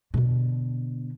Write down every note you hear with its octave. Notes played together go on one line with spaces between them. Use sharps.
B2 D3